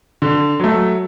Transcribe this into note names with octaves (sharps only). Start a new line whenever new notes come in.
D3
F#3 A3